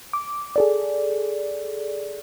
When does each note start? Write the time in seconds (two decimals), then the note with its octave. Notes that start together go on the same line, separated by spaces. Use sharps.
0.13 D6
0.56 G#4 A4 D5